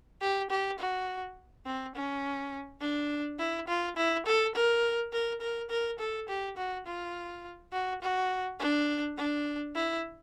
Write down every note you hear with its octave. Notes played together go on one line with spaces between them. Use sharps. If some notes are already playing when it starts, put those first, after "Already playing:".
G4
G4
F#4
C4
C#4
D4
E4
F4
E4
A4
A#4
A#4
A#4
A#4
A4
G4
F#4
F4
F#4
F#4
D4
D4
E4